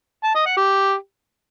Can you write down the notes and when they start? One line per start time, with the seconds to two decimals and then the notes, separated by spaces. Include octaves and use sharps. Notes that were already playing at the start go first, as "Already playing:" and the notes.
0.24 A5
0.35 D#5
0.46 F#5
0.57 G4